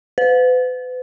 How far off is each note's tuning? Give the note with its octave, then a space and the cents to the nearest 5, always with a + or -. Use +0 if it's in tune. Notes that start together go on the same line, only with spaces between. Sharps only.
B4 +40